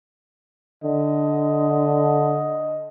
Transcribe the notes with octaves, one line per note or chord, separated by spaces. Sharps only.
D3 D#5